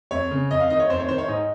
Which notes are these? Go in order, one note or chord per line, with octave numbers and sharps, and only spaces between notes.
F2 C#5
C#3
F2 D#5
F5
D#3 D#5
C#5
F2 C5
C#5
D#3 C5
C#5
G#2 D#5